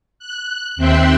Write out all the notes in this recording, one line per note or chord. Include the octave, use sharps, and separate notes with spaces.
F#6
D#2 C4 E5 G5 C6 F#6